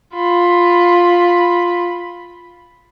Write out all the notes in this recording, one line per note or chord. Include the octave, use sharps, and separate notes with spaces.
F4 B5